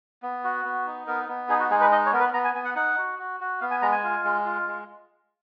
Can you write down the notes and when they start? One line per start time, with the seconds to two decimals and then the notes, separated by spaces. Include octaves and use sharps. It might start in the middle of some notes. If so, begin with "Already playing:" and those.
0.23 B3
0.44 F#4
0.65 B3
0.86 D#4
1.07 B3 A#4
1.28 B3
1.49 D#4 G#4
1.60 F#4
1.70 G#3 G#4
1.81 B4
1.92 D#4 D#5
2.06 C#5
2.12 B3 A#4
2.20 B4
2.33 B3 A#5
2.44 G#5
2.55 B3 G#5
2.65 F#5
2.76 D#4 F#5
2.98 F#4
3.19 F#4
3.40 F#4
3.61 B3 F5
3.71 G#5
3.82 G#3 A#5
3.92 G#5
4.04 F4
4.24 G#3
4.45 F4
4.67 G#3